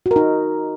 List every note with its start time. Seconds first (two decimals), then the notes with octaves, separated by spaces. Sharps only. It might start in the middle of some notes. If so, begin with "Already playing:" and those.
0.06 F#4
0.11 A#4
0.16 D#4